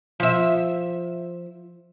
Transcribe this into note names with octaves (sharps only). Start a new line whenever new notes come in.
F3 E5